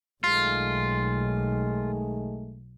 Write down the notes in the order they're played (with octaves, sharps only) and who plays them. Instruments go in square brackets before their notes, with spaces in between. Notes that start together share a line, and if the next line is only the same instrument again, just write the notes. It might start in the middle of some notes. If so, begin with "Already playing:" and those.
[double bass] B1 [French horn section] D#3 G#3 A3 [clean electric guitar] F4